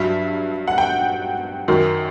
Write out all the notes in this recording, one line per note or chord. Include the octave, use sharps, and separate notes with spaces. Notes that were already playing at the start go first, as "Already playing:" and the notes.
Already playing: G2 F#3 E5
F#5
G5
F#2 D#3 F#3